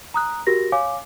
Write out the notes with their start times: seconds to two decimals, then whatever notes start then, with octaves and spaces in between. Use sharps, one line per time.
0.14 A#5 D#6 F#6
0.47 F#4 G4 A#4 A#6
0.72 C#5 F5 G#5 D6